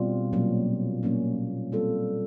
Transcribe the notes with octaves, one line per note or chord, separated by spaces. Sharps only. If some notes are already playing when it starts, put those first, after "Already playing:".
Already playing: B2 G3 C4 F4
A#2 F#3 A#3 C#4
A#2 F#3 A#3 C#4
G3 C4 F4 A4